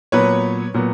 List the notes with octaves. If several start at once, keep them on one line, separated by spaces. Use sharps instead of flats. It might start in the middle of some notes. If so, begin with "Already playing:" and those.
A#2 F#3 B3 B4 C#5
A#2 F#3 B3